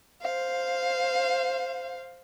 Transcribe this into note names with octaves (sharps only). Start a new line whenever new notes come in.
C5 F5